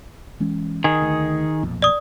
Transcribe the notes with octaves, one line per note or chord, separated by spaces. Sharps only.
E3 G#3 C#4
D#3 G#4
D2
B1 F2 A#2
D5 D#6